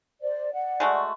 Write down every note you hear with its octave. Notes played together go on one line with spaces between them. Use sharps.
C5 D5
D5 F#5
G#3 A3 F#4